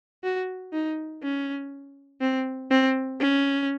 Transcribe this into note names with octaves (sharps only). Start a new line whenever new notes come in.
F#4
D#4
C#4
C4
C4
C#4